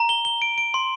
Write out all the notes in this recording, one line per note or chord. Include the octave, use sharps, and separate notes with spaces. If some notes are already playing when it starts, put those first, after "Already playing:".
Already playing: A#5
G7
G7
D7
D7
C6